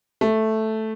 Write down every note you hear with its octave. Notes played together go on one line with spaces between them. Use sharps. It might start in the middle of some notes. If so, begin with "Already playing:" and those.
A3